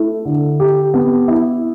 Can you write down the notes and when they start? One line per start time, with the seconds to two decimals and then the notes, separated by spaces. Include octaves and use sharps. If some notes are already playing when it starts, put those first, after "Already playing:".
Already playing: A3 E4
0.25 D3
0.60 G4
0.94 B3
1.28 E4